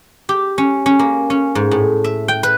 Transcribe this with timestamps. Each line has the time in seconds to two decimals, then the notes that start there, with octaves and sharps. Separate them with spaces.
0.29 G4
0.58 C#4
0.86 C#4
0.99 A#3
1.30 C#4
1.55 G#2
1.71 A2
2.04 E5
2.28 G5
2.43 B4